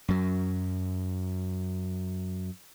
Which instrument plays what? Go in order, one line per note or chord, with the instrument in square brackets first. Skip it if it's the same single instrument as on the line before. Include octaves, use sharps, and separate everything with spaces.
[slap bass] F#2 F#3